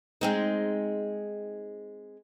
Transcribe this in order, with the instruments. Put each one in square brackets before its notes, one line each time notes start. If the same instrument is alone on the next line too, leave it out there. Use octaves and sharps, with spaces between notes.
[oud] G#3 C4 D#4